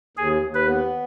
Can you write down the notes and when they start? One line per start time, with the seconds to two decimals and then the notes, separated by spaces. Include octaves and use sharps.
0.17 D#2 G#4
0.42 D#2
0.55 B4
0.67 B3